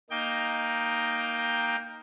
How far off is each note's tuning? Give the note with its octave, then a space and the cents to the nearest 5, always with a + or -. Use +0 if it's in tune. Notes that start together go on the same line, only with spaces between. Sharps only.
A#3 +5 D#4 +0 G5 +10